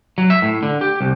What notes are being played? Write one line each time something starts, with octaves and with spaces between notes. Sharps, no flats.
F#3
E5
A2
D3
G4
C2